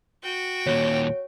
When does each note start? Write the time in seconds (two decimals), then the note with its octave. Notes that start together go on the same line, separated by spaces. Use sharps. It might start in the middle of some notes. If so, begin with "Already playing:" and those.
0.23 F#4 G5
0.67 D#2 A#2 C#5